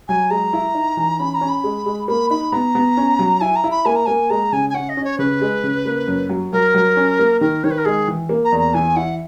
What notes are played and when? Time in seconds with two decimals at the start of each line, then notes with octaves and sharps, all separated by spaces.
0.08 F#3 G#5
0.30 G#3 A#5
0.53 E4
0.75 D#4
0.97 E3
1.19 C#4 B5
1.34 A#5
1.41 C#4
1.49 B5
1.64 G#3
1.86 G#3
2.08 A#3 B5
2.30 D#4 B5
2.52 B3 A#5
2.75 B3
2.97 C#4
3.19 F#3
3.41 E4 G#5
3.56 A#5
3.64 E4
3.71 B5
3.85 A#3 G#5
3.96 A#5
4.06 A#3 G#5
4.30 G#3 A#5
4.52 C#3 G#5
4.70 G#5
4.74 C#4 F#5
4.89 D#5
4.97 C#4
5.04 C#5
5.19 C#3 B4
5.41 G#3
5.63 C#3
5.85 A#3
6.08 F#2
6.29 F#3
6.53 F#3 A#4
6.74 F#3
6.97 C#4
7.19 A#3
7.41 D#3 A#4
7.64 D#3 C#5
7.71 B4
7.78 A#4
7.85 G#3 G#4
8.08 E3
8.29 A#3
8.45 A#5
8.52 E2
8.59 A#5
8.74 E3 G#5
8.96 E4 F#5